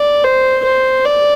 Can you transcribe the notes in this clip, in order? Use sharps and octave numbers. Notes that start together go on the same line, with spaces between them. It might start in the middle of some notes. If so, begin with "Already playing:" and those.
Already playing: D5
C5
C5
D5